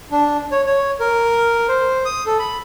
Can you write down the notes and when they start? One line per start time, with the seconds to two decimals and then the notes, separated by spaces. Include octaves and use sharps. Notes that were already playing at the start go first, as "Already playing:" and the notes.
0.11 D4
0.52 C#5
0.66 C#5
1.00 A#4
1.69 C5
2.05 D#6
2.26 A4
2.39 B5